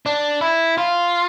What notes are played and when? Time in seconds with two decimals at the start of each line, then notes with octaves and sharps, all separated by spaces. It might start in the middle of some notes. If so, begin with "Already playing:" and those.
0.06 D4
0.41 E4
0.78 F4